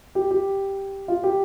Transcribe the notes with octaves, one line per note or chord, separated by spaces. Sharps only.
G4
G4
F4
G4